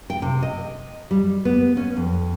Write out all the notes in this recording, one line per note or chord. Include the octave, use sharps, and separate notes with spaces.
G5
C3
D#5
G3
B3
C#4
F2